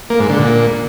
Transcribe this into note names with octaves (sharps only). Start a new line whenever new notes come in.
A#3
G#2
D3
A#2